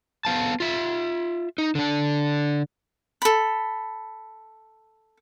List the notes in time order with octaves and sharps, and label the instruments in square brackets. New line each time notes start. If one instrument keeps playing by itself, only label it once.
[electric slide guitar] B3 F5 A5
F4 E5
D#4
D3 D4
[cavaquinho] A4 B5